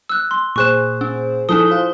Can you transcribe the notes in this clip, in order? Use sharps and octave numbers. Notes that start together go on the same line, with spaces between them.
E6 F#6
C6
A#2 G#4 C5 C#6 F#6 E7
C#4
F3 D#4 E4 A4 D#6 G7
F4 C5